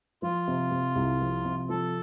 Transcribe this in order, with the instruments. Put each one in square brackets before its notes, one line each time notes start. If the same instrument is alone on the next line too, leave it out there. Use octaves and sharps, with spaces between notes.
[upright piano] F3 [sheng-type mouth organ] F4
[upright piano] C3
C3
C2
F3
C3
[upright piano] F3 [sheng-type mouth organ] A4